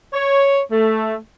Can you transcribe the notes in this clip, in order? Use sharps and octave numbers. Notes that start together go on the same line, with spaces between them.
C#5
A3